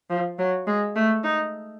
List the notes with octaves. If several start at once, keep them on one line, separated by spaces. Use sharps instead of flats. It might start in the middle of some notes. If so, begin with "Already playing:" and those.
F3
F#3
G#3
A3
D#4